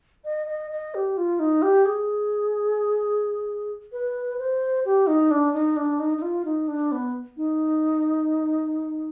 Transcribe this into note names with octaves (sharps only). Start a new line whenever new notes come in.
D#5
D#5
D#5
G4
F4
D#4
G4
G#4
B4
C5
G4
D#4
D4
D#4
D4
D#4
D#4
F4
D#4
D4
B3
D#4